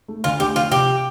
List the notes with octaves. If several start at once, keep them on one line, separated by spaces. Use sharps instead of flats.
A3
D2 F4
D2 G4
F3 F4
C3 G4